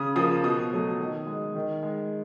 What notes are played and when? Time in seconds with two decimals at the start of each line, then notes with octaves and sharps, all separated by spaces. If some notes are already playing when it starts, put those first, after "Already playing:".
Already playing: C#3 D#6
0.16 F3 A#3 D#6
0.44 B2 D#6
0.72 F#3 A3
0.99 D#3
1.27 G#3
1.55 D#3
1.83 G#3